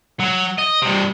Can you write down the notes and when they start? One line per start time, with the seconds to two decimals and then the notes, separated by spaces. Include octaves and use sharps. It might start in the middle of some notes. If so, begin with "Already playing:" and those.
0.20 F#3
0.58 D#5
0.82 G2 C3